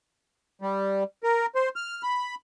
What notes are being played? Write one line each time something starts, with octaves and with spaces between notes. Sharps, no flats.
G3
A#4
C5
F6
B5